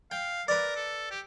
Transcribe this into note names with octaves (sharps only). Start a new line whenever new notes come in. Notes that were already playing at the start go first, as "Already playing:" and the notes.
F5 G5
A#4 B4 D5
A4
G4